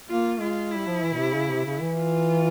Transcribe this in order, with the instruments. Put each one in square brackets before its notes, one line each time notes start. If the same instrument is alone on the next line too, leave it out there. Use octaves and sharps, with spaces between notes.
[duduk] A#3 [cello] F4
[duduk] G#3 [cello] F4
[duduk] G3 [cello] E4
[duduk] F3
E3
A#2
C3
C#3
C3
C#3
E3
[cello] F4